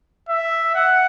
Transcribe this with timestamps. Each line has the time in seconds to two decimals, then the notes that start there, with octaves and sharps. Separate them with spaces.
0.29 E5
0.75 F#5